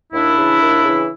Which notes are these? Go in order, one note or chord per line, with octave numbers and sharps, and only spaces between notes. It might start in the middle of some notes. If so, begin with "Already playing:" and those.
D#2 D4 E4
C#3 E3
D#2
C#3 E3